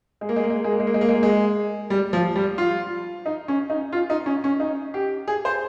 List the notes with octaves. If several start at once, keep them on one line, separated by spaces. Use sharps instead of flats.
G#3
A#3
G#3
A#3
G#3
A#3
G#3
A#3
G#3
A#3
G#3
A#3
G#3
A#3
G#3
G3
F3
G3
F4
D#4
C#4
D#4
F4
D#4
C#4
C#4
D#4
G4
G#4
C5